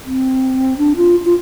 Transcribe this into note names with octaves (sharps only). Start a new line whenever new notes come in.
C4
D4
F4
F4